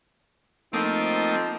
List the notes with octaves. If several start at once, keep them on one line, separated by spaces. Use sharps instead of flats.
F3 A3 A#3 C4 D#4 D#6